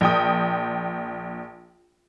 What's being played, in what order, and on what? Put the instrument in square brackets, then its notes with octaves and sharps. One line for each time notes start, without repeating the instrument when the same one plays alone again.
[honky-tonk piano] A#1 G5 D#6